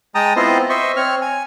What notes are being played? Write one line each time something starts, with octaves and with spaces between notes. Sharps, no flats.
G#3 G5 A5 A#5 D#6
B3 C4 E4 F4 C5 D#5
C5 D#5 E5 C#6
C4 C#5 F6
G#5